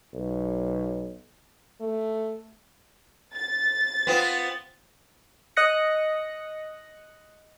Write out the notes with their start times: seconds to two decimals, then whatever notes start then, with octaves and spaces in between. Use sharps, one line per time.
0.14 B1
1.81 A3
3.35 A6
4.07 B3 C4 F4
5.57 D#5 D#6 F#6 A#6 C#7